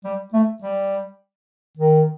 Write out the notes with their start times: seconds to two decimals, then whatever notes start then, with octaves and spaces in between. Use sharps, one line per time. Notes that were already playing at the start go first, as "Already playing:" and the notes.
0.04 G3
0.33 A3
0.62 G3
1.77 D#3